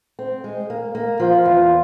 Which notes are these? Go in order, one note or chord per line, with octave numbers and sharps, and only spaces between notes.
C4
G#3
A#3
A#3
F3 F4
E2